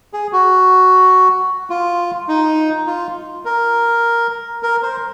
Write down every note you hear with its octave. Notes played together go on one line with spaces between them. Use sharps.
G#4
F#4
F4
D#4
F4
A#4
A#4
C5